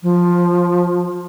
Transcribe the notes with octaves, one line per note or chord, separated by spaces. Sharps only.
F3